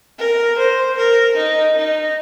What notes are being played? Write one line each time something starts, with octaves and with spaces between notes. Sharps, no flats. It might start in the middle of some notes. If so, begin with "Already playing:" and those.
A#4
C5
A#4
D#4
D#4